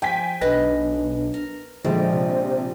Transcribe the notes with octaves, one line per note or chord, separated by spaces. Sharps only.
F3 G5 G#5 B6
B1 D4 B4 D#5 G#5 A#6
A#4
A#1 D3 F3 G3 G#3 C5
C3